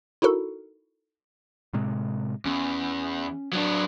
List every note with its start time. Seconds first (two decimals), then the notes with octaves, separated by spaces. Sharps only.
0.22 D#4 E4 F#4 A4 A#4
1.73 A2 C3 G#3
2.45 E2 C#4
3.53 F#3 D4